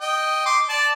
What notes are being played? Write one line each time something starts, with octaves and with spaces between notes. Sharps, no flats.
D#5 G5
C6 D6
D5 A5